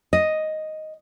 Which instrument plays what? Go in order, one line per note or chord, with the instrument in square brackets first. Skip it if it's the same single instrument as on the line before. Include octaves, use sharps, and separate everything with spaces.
[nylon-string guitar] D#5